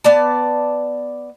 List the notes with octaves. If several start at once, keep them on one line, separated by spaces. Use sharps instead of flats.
B3 D5 A5